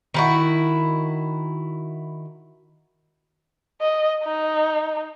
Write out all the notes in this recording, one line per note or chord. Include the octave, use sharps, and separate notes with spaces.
D#3 E4 F#4
D#5
D#4